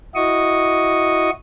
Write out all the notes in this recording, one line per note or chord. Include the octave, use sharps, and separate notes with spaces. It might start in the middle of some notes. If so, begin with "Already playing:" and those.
E4 F#4 D#5 C#6 D#6